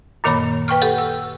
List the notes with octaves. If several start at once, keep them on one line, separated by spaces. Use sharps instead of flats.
F#2 A#2 D#3 A#3 C#5 B5
B4 G5 C#6 F6
G4 A4 F#5
E6